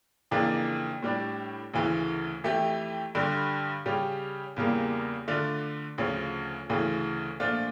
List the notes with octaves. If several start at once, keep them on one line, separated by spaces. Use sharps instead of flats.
F2 C#3 E3 A#3 D4
A2 G3 D4
D2 C#3 E3 A3
F2 E3 A3 E4 G4
G2 D3 G3
C#3 G3 C#4 G4
E2 C#3 G3 A#3
D3 A3 D4 F4
D2 C#3 F3 C#4
D2 C#3 E3 A3
A#2 F3 A3 D4 F4